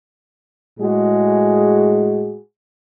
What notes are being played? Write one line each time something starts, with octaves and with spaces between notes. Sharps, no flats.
A2 G#3 F#4 G#4